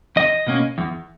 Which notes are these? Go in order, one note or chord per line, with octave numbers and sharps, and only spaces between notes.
E2 D#5
B2 A#3 C#4
E2